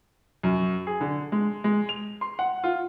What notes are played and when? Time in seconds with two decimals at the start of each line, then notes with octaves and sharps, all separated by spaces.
0.43 F#2
0.87 G#4
1.01 D3
1.32 G#3
1.64 G#3
1.89 F7
2.21 C6
2.39 F#5
2.64 F4